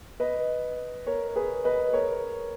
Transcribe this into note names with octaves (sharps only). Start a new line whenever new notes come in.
B4 D#5
A#4 C#5
G#4 B4
B4 D#5
A#4 C#5